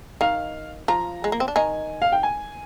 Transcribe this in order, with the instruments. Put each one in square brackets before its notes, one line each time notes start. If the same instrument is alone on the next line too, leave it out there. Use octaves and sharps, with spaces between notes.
[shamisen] D#3 D#4 [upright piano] F5
[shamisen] F3 F4 [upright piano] A#5
[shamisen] G#3
A#3
C4
D4
[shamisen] D#3 D#4 [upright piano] G#5
[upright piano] F5
G5
G#5